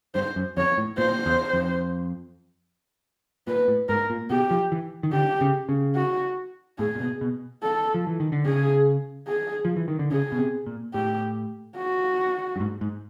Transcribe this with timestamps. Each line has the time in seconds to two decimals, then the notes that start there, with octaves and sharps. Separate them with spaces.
0.15 G2 C5
0.36 F#2
0.57 F2 C#5
0.77 A2
0.98 A#2 C5
1.26 E2
1.53 F2
3.47 A#2 B4
3.68 A2
3.89 G#2 A#4
4.10 A#2
4.30 B2 G4
4.51 F3
4.72 E3
5.03 D#3
5.13 D3 G4
5.41 C#3
5.69 C#3
5.96 F#4
6.79 A2 G#4
6.95 A#2
7.00 B2
7.21 B2
7.63 A4
7.94 F3
8.07 E3
8.20 D#3
8.32 D3
8.46 C#3 G#4
9.28 G#4
9.65 F3
9.76 E3
9.88 D#3
9.99 D3
10.11 C#3 G#4
10.32 B2
10.39 C3
10.67 A#2
10.94 A2 G4
11.77 F#4
12.56 G2
12.60 G#2
12.81 G#2